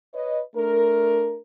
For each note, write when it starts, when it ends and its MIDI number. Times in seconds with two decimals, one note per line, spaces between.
0.13 0.40 71
0.13 0.40 73
0.13 0.40 75
0.55 1.37 57
0.55 1.37 62
0.55 1.37 70